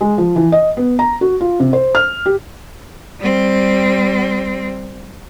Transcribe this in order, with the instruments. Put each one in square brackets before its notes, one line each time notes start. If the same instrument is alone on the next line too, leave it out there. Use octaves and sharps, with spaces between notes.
[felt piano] G#3
F3
E3
D#5
B3
A#5
F#4
F4
C3
C5
F6
G4
[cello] G3 C4